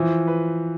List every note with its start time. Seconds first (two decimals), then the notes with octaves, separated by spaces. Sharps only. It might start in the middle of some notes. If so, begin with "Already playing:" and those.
Already playing: E3 F3
0.27 B4